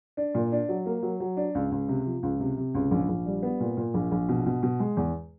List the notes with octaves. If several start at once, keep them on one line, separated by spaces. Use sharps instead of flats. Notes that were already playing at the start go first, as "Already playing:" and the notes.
D4
A#2
D4
F#3
A#3
F#3
F#3
D4
C#2
C#2
C3
F3
C#2
C3
C3
C#2
A#1
A#1
G3
B3
A#2
A#2
A#1
A#1
B2
B2
B2
G#3
E2